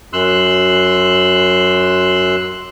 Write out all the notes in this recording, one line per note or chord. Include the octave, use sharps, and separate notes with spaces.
F#2 C6 E6 F#6